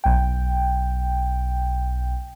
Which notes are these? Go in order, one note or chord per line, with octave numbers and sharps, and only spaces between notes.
B1 G5